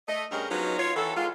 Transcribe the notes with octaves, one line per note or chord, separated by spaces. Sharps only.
A3 D#5
G2 C#4 G4 G#4 A#4
F3 F#3 G#3 B3 C#4 D#4
F4 C#5
D#3 E3 F#4 A4
D#3 G#3 B3 F4